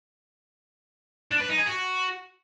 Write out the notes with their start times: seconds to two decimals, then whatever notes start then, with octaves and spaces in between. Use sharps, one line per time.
1.31 D4
1.40 B4
1.49 D#4
1.57 G#4
1.66 F#4